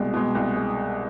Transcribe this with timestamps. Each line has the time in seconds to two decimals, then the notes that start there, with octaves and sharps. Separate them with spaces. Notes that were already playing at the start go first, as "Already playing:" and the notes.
Already playing: C2 B2 G#3
0.13 B2 G#3
0.35 C2
0.56 G#3